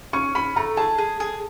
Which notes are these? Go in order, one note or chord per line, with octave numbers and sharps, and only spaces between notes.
C#4 C#6
C#4 B5
A3 A#5
G#4 A5
G#4
G#4